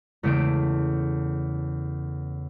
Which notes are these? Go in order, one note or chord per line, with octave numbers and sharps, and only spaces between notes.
E2 C#3 A3 D7